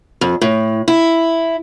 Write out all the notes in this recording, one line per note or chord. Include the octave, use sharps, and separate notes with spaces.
F2
A2
E4